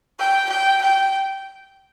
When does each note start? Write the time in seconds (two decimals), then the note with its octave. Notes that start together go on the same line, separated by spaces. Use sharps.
0.19 G5
0.50 G5
0.82 G5